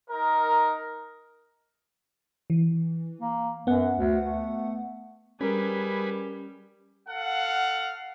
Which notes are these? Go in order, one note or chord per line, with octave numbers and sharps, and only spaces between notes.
D#4 A#4
E3
A#3
F#2 B3 F#5
D2
A3
G3 C#4 G#4 A#4 B4
A4 F5 F#5